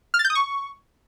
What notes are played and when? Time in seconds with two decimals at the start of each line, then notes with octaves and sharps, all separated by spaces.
0.14 F6
0.19 A6
0.25 G6
0.30 D#6
0.35 C#6